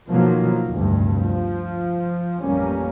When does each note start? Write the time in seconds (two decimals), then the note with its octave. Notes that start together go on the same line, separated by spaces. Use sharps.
0.10 B2 D#3 F3 F#3 A#3
0.68 F1 D2 G2
1.18 F3
2.43 A1 F2 G3 A#3 C#4